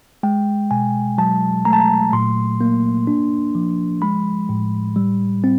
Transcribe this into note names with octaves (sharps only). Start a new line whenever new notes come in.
G#3 G5
B2 G#5
F#3 A5
A3 A#5
A5
A#5
A#2 C6
A#3
D4
F3
G#3 B5
A2
G3
C4